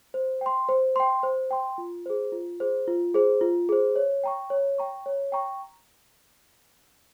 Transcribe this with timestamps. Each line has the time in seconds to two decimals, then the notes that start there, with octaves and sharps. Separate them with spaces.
0.14 C5
0.41 G5 C6
0.69 C5
0.96 G5 C6
1.23 C5
1.51 G5 C6
1.78 F4
2.06 G#4 C5
2.32 F4
2.60 G#4 C5
2.88 F4
3.14 G#4 C5
3.41 F4
3.69 G#4 C5
3.96 C#5
4.24 G5 A#5 C#6
4.50 C#5
4.78 G5 A#5 C#6
5.06 C#5
5.32 G5 A#5 C#6